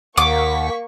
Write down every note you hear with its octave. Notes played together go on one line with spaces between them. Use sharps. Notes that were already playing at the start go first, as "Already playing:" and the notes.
D#2 A#3 F#5 C#6 D6 B6